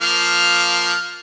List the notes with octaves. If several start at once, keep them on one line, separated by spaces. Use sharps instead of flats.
F3 A#3 F6